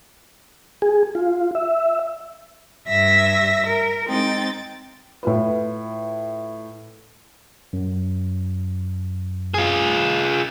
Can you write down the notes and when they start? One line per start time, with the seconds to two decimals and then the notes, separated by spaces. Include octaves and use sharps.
0.82 G#4
1.15 F4
1.55 E5
2.88 G2 E5 E6 A#6
3.67 A#4
4.07 G#3 C4 D#4 G5 A6
5.23 A2 F4 B4
7.73 F#2
9.54 F4 G#4